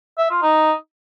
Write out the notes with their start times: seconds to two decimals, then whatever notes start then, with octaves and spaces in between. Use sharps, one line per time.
0.18 E5
0.30 F4
0.42 D#4